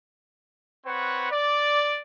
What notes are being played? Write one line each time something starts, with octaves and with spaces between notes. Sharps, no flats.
C4 B4 C#5 F#5
D5